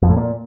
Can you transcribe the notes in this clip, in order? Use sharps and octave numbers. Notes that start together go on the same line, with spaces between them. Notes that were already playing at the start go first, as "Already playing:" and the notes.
F2
A2
A#2